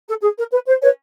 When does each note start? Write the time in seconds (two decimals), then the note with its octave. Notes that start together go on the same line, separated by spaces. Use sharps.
0.07 A4
0.22 G#4
0.37 A#4
0.51 B4
0.66 C5
0.82 B4 C#5